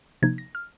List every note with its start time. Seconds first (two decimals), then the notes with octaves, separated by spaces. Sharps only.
0.22 C3 F3 A#3 D#4 G#6
0.38 A#6
0.55 F6